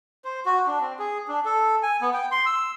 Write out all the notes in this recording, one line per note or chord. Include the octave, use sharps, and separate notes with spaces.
C5
F#4
D4
C4
G#4
D4
A4
G#5
B3
G5
C6
E6